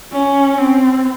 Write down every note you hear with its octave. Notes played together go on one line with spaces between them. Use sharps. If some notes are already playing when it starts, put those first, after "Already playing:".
C#4
C4